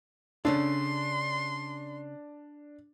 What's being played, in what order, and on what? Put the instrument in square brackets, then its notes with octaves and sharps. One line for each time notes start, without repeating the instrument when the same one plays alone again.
[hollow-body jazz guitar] C#3 C#4 A4 [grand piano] D4 [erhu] C6